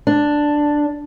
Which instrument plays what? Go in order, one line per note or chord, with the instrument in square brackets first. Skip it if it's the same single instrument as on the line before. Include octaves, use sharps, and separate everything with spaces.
[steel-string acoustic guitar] D4